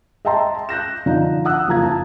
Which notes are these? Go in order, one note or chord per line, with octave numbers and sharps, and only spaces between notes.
D#5 E5 G5 A5 A#5 C6
F#6 G6 A#6 E7
D3 F3 D#4
F#5 D#6 E6 F#6
F#1 F3 A#5 G#6
A5